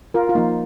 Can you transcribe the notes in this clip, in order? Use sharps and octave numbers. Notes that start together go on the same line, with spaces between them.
F4 A#4
F4
F3 A#3 D#4